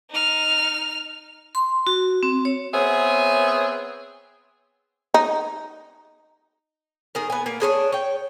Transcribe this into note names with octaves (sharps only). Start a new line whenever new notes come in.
D#4 F6
C6
F#4
C4
C#5
B3 C4 G#4 C#5 E5
D#4
D#3 G#4 A#4
B3 G#5
A#3 B3
D4 G#4 B4 C#5
C#5 G5